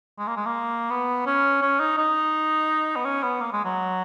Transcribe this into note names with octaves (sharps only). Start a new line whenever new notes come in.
G#3
A#3
G#3
A#3
B3
C#4
C#4
D#4
D#4
B3
C#4
B3
A#3
G#3
F#3